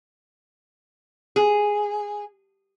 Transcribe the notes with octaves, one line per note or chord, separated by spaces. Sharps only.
G#4